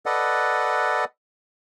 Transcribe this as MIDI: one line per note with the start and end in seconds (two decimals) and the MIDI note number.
0.06 1.05 69
0.06 1.05 71
0.06 1.05 74
0.06 1.05 75
0.06 1.05 78